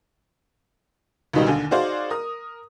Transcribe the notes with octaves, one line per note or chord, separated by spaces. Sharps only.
C#2 G#2 B2 D#3 G3 D#4
D#2 D3 G#5
D#4 F#4 G#4 C5 D5 F5
A#4 D#6